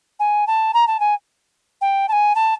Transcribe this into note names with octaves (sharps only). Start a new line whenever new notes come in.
G#5
A5
A#5
A5
G#5
G5
A5
G#5
A5